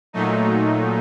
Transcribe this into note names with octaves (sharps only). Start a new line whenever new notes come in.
A#2 F#3 A3 D#4